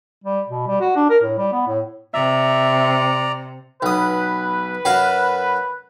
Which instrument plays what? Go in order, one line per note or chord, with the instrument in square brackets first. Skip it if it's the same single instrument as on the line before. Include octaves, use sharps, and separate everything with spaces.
[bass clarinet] G3
B2
G3
F#4
D4
A#4
A2
G3
B3
A2
[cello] C3 [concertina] D5 A#5 [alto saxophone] E5
[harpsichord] B1 D#6 [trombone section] B4
[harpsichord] F#2 F#4 F5